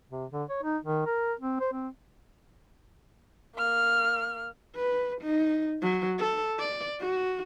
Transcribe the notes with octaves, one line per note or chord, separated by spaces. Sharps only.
C3
D3
C#5
D#4
D#3
A#4
C4
C5
C4
A#3 F6
B4
D#4
F#3
A4
D5
F#4